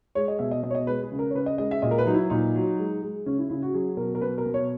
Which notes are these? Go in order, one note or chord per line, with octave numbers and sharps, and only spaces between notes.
G#3 C#5
D#5
B2 E5
D#5
B2 D#5
C#5
D#5
G#3 B4
G#4
C#3
A#4
C#5
C#3 B4
D#5
G#3 D#5
E5
A#2 D#5
A#4
B4
F#3 D#4
E4
A#2 D#4
F#3
G#3
G#3
C#3 C#4
E4
C#3 E4
F#4
F#3 G#4
B2 A#4
A#4
B2 B4
A#4
B2
C#5